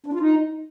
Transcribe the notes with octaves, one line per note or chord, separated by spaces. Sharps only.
D4
F4
D#4